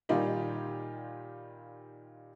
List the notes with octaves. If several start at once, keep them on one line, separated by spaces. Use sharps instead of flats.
A#2 D#3 G3 D#4 F4 G4